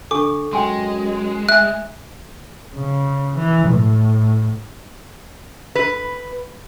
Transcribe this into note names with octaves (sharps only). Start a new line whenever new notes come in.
D3 A4 G#5 C#6 D6
F#2 G#3 G5 G#5 C6
E5 G#5 F#6
C#3
E3
A2
B4